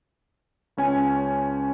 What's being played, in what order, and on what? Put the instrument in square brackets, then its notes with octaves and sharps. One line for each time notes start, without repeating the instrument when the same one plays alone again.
[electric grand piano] C#2 C#4 G#5